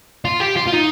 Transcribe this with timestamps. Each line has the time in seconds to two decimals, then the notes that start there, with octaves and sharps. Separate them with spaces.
0.25 F4
0.40 G4
0.56 F4
0.67 F4
0.72 D#4